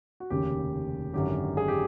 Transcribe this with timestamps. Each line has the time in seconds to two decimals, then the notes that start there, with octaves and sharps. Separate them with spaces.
0.20 F#4
0.30 F1 D#2 C#3 G4
1.13 G#1 F#2 D3 F#3 G4
1.57 G#4
1.68 G4